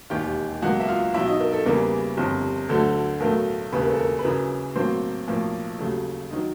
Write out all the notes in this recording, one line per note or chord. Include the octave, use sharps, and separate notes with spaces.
E1 D#2 D#3 G4 G5
C#2 B2 F#3 A#3 F#4 F#5
E5
F4 F5
B1 B2 F#3 E4 E5
D#4 D#5
A#4
A4
E2 C#3 E3 G3 A#3 A#4
G1 F2 C3
D2 D3 F#3 A3 A4
B1 A2 F#3 A3 A#4
E1 D#2 C#3 B4
A#4
A4
A#4
B4
F#2 C#3 E3 A#4
B1 A2 F#3 A#3 C4 C5
B1 A2 F3 A#3
D#2 C#3 F#3 A3
D#3 F#3 D#4 D#5